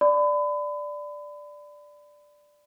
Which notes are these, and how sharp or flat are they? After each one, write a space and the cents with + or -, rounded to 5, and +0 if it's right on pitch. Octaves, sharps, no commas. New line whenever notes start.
D5 +0 B5 +30